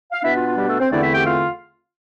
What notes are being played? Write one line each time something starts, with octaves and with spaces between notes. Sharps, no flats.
F5
B2 B3 D4 E4 E5
F4
F4
G3 G4
A3 A4
C4 C5
E2 D3 A3 C4 D4 E4 D5
E4 E5
G4 G5
F4 F5